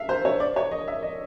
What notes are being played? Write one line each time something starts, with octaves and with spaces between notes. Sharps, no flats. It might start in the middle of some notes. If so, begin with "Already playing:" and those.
Already playing: E5 F5
C5
C#5
D5
C#5
D#5
E5
D#5